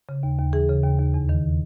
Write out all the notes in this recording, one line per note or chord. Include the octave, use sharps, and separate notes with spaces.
C#3
D#2
D#2
E3 G#4
C#3
D#2
D#2
E2
D#3